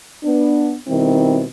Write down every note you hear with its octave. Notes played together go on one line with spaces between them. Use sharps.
B3 D4
B2 D#3 G3 C4 E4